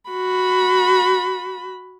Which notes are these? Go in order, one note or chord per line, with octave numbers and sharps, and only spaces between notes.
F#4 B5